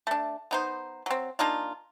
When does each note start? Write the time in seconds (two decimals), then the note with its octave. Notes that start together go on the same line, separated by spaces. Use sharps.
0.07 A3 D4
0.51 B3 D#4 C5
1.06 F#3 C4
1.39 A#3 D4 D#4 F4